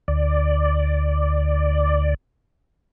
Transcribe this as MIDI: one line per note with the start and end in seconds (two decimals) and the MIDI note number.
0.08 2.14 38
0.08 2.14 74